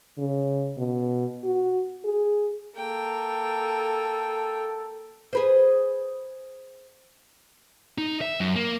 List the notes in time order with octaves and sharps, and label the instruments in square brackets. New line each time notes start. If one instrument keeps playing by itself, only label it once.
[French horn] C#3
B2
F#4
G#4
[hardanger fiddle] A#3 G5 [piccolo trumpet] A4
[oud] G#4 B4 C5
[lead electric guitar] D#4
E5
F#2
A#3